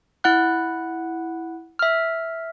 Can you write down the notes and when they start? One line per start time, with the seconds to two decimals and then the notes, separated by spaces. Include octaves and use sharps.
0.24 E4 F#5 F#6
1.79 E5 F6